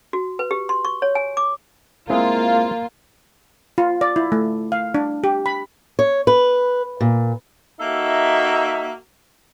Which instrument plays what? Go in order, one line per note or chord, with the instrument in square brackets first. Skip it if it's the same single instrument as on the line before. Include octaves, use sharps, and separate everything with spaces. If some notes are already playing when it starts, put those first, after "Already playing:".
[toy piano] F#4
B4
G4
C6
C#6
C#5
G#5
D6
[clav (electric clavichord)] G#3 C4 E4 [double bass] A#3 [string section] F4
[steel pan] F4
D5
E4
A3
F5
D4
G4
B5
[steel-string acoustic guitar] C#5
B4
A#2
[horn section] A#3 D#4 F#4 A4 E5